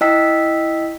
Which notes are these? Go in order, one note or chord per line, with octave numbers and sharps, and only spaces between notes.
E4 D#5 G5 E6 B6